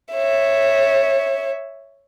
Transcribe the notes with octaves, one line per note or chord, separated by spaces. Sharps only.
C#5 E5